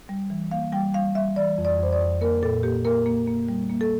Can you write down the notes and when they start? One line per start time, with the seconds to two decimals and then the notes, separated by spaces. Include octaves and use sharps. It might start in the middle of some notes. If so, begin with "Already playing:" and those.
0.09 G3
0.30 E3
0.51 A#3 F5
0.73 G3 G5
0.94 G3 F5
1.15 G3 E5
1.36 E3 D5
1.58 F2
1.65 D5
1.79 F2 C5
1.93 D5
2.00 F2
2.21 A#3 A#4
2.43 A#2 A4
2.63 A#3 G4
2.85 A#3 A#4
3.06 A#3
3.27 A#3
3.49 G3
3.70 A#3
3.81 A4